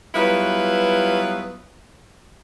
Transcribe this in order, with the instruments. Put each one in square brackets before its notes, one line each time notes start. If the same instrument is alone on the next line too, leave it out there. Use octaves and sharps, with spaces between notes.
[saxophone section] F#3 G3 B3 E4 F4 B4